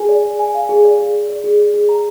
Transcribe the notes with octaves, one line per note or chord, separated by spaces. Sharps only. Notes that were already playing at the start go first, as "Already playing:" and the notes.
Already playing: G#4 G#5
D5
G#4
G#5
F5
G#4
D5
G#4
D5
D5
G#4
D5
G#4
A#5